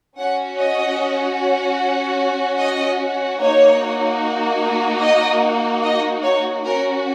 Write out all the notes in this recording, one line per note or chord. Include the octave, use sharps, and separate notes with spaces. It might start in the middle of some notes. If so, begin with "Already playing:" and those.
C#4 F#4 F#5
D#5
D#5
A#3 D#4 F#4 C#5
D#5
D#5
C#5
C#4 F#4 A#4